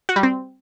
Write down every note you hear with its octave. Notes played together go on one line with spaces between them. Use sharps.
F#4
G3
C4